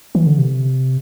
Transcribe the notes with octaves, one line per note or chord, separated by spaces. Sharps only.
E3
D3
C3